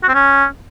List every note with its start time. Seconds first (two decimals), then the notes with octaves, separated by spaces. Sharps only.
0.03 F#4
0.09 C4
0.14 C#4